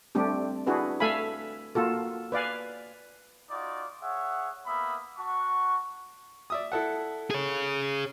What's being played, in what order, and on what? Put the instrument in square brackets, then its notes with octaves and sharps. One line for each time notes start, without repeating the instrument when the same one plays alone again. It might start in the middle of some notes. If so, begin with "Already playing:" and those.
[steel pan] G3 A3 C4 D4 G4
D4 E4 F#4 G#4 B4
A3 A4 E5 F5 G#5 B5
A#3 F4 F#4 A4
B4 D5 F5 G#5
[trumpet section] D#4 F4 F#4 D5
G#4 C#5 E5 F#5
A#3 B3 E5 B5 D#6
F#4 F#5 A5 C#6
[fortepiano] D5 E5 D#6
E4 A4 F#5
[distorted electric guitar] G#4 C#5